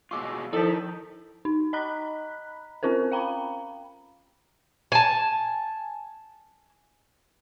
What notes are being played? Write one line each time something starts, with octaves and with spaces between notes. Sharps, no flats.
B2 G#3 F4 C#6 D6 E6
D#3 F3 D#4 E4 A4 B6
D#4
D#5 A#5 B5 F#6 B6
C4 C#4 F4 A#4 C5
F5 G5 A#5 B5
G#5 A5